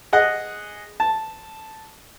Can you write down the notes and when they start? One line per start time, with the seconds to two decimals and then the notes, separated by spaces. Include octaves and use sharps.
0.13 G#4 D#5 F#5
1.00 A5